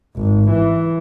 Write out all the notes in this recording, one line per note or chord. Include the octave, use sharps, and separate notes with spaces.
G#1
E3